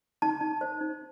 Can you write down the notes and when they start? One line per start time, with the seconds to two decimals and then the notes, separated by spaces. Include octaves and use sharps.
0.22 D#4 A5
0.41 D#4
0.61 C5
0.81 D#4